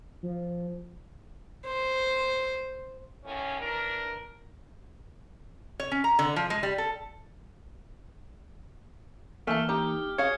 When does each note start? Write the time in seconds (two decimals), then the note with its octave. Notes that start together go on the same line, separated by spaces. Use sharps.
0.23 F3
1.66 C5
3.24 D#2 A2 C#4
3.60 E3 D4 A#4
5.80 C#5
5.91 C#4
6.04 A#5
6.19 D3
6.36 F3
6.50 G#3
6.63 G3
6.78 A4
9.47 E3 A3 A#3 G#5 A5 F6
9.69 D#4 G4
10.18 F#4 G#4 C#5 F5 G#6 C#7